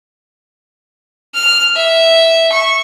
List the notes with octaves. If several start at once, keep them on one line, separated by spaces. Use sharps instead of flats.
F6
E5
C#6